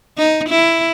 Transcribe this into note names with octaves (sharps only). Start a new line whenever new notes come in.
D#4
E4